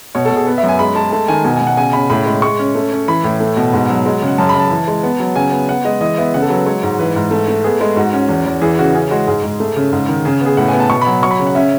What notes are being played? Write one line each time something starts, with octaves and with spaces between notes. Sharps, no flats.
B2 C#5
A4
B2
G#4
B3
E5
F#2
G#5
G#3 B5
G#3 A5
A3 A5
D#3 G#5
B2 G#5
B2 G#5
F#5
C#3 G#5
C#3 B5
A2 B5
G#3
G#3 C#6
C#4
A3
C#4
E3 B5
A2
A3
B2
G#2
F#3
G#3
C#3
F#5
F#2 A5
B5
F#2 A5
E3
G#3
B3
F#3
C#3 G#5
B3
B3 F#5
G#3 D#5
E3 D#5
B3 E5
C#3 F#5
A4
F#3 B4
G#3 C#5
G#2
E3 B4
G#2
A3
A3
B3 G#4
G#3
G#2 F#4
C#4
E2
E2
E3 G#4
C#3 F#4
C#4 G#4
G#3 F#4
G#2 G#4
G#2
A3
C#3
G#2
D#3
C#3 G#4
B3
G#4
A2 F#5
G#5
B3
A5
B2 C#6
B5
F#3
F#3 C#6
B5
C#3
F#5
C#4 E5